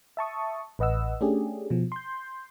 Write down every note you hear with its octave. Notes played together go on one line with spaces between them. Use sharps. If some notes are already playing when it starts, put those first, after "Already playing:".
E5 A5 C#6 D#6
A1 B4 D#5 F#5 E6
A3 C#4 D4 G4 G#4
B2 F3
C6 G6